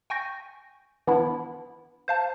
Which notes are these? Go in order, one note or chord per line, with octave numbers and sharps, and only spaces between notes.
G5 G#5 C#6 G6 A#6
E3 B3 D4 E4
C5 F5 A5